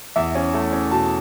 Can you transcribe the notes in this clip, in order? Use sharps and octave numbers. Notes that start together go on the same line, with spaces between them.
E2 E5
C#4
A3
C#4
B2 A5